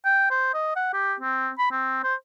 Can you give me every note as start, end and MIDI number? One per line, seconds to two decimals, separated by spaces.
0.05 0.27 79
0.31 0.53 72
0.54 0.73 75
0.76 0.91 78
0.93 1.15 67
1.20 1.50 60
1.59 1.68 83
1.72 2.01 60
2.04 2.15 72